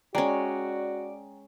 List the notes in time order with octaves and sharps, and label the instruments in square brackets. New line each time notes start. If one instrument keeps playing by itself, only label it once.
[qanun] G#3 C#4 [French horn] F#4 [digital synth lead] D5 [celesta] G5 G#5 A#5